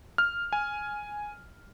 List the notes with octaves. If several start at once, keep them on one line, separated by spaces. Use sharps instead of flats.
F6
G#5